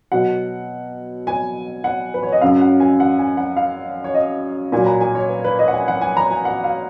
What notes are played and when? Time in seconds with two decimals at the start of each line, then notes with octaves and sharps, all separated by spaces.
0.12 B2 F#3 F#5
1.27 G#5
1.84 F#5
2.14 B4
2.23 C#5
2.32 D#5
2.41 F#2 C#3 F#3 F5
2.62 F#5
2.80 G#5
3.00 F#5
3.19 G#5
3.37 F#5
3.57 F5
4.04 C#5
4.14 D#5
4.72 A#2 G#5
4.76 F#3
4.82 G#5
4.86 A#5
5.01 G#5
5.15 C#5
5.29 B4
5.44 B4
5.59 D#5
5.68 F#5
5.73 G#5
5.88 F#5
6.01 G#5
6.17 A#5
6.31 G#5
6.45 F#5
6.64 F5